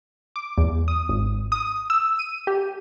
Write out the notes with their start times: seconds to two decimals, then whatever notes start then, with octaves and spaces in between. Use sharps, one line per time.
0.36 D6
0.58 E2
0.88 D#6
1.09 G#1
1.52 D#6
1.90 E6
2.19 D#7
2.47 G4